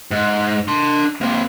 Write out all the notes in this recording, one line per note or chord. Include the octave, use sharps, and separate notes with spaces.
G#2
D4 C6
A#3 C4